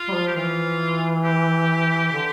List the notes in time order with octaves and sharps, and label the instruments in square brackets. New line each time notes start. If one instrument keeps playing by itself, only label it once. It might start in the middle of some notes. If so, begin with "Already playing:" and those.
Already playing: [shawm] F4
[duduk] G3
F3
[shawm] G4
[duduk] E3 [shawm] F4
[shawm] G4
[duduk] D3